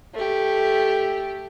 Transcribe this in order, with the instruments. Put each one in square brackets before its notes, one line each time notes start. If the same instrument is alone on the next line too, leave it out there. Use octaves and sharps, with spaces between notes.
[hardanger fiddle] A3 G4